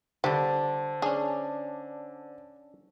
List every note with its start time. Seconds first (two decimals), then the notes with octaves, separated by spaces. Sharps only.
0.24 D3 G3 G4 C5 A5
1.02 C#4 D4 G#4